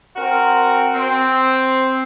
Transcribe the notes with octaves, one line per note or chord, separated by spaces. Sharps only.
C4 F#4 A#4
C4